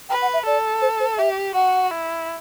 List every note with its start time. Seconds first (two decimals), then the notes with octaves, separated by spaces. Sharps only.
0.09 B4 G5
0.22 F#5
0.34 E5
0.46 A4 D5
0.82 C5
1.00 C5
1.18 G4 E5
1.54 F#4 F#5
1.91 E4